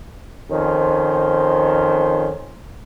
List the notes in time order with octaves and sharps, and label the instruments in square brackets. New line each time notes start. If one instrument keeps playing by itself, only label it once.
[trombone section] F2 D#3 C#4 C5